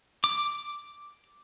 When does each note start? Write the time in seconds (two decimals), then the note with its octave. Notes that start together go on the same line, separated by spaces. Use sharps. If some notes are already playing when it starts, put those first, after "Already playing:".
0.24 D6